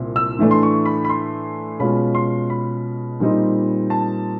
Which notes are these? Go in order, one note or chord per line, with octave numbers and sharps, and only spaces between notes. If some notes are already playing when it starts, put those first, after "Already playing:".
Already playing: C2 A#2 C4
E6
A2 E3 A3 D4
C6
C#6
B5
B5
C6
B2 G#3 C#4 F4 B5
C6
B5
A#2 G3 C4 D#4
A5